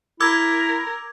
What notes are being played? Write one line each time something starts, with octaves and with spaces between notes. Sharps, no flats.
E4 A#4 D6 E6 G#6